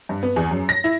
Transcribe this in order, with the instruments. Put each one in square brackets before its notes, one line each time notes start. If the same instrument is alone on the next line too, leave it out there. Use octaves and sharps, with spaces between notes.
[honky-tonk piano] G2
B3
E2
F#2
A#6
E4